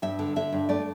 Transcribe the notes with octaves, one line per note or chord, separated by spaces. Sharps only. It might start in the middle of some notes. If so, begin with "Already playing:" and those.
G2 E5
D3
D3 E5
G2
A3 D5